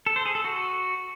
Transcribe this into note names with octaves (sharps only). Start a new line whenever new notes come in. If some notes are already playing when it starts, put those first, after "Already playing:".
A4
C5
G#4
A4
F#4